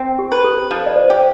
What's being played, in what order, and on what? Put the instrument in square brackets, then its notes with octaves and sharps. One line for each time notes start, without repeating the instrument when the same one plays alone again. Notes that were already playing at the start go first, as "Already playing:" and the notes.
Already playing: [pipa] C4
[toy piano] G4
[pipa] B4
[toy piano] A4
[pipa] F3
[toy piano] D5
C5
[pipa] G4